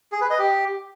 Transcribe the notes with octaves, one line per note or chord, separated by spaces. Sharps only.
G#4
B4
D#5
G4